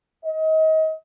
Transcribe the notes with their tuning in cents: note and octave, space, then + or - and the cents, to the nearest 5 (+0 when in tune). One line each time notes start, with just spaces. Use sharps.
D#5 +30